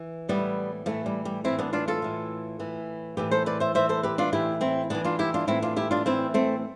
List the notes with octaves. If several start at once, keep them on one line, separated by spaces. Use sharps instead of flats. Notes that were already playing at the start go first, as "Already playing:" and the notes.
Already playing: E3
A2 E3 G3 B3
A2 E3 F3 A3
G3
G3
A2 E3 C4 E4
B3 D4
D4 F4
F4 A4
A2 E3
A2 E3
A2 E3 G4 B4
A4 C5
B4 D5
C5 E5
A2 E3 C5 E5
A4 C5
G4 B4
D4 F4
A2 E3 E4 G4
C4 E4
A2 E3 B3 D4
D4 F4
E4 G4
D4 F4
A2 E3 C4 E4
D4 F4
E4 G4
D4 F4
A2 E3 C4 E4
A3 C4